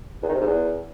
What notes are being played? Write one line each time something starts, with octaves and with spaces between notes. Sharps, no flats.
E2
D#3
C3
G#2
E2